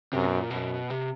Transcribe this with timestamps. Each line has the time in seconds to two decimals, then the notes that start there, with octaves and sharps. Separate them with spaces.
0.13 F#2 C3
0.26 B2
0.38 A#2
0.50 F#2 B2
0.90 C3